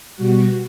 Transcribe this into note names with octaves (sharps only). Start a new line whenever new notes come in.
B2 G3 F#4